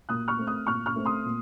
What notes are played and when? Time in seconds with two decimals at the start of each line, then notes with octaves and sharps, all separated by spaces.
0.09 A#2 D#6 F#6
0.28 C#6 F6
0.38 A3 C4
0.47 D#6 F#6
0.67 A#2 C#6 F6
0.86 C#6 F6
0.96 A3 C4
1.05 C6 D#6
1.25 A#2